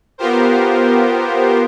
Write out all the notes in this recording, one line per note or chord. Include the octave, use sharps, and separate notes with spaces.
B3 F4 G4 A#4 C5